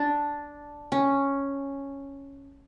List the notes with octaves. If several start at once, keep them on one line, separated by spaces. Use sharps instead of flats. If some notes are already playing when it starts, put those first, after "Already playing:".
Already playing: D4
C#4